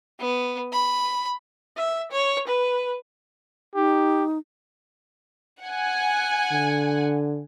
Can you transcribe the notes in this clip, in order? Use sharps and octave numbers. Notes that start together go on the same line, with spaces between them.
B3
B5
E5
C#5
B4
D#4 G4
F#5 G#5
D3